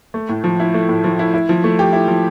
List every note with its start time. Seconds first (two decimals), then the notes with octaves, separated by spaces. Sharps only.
0.14 A3
0.29 A2
0.44 F3
0.60 E4
0.74 A3
0.89 A2
1.04 F3
1.19 E4
1.34 E4
1.49 F3
1.64 A3
1.79 G4
1.93 E4
2.08 F3